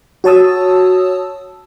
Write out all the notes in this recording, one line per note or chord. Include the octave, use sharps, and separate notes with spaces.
F#4 C#5 A5 D#6 E6